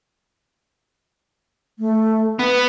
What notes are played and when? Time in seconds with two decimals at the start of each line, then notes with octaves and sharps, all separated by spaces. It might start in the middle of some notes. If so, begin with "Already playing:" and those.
1.79 A3
2.39 B3 B4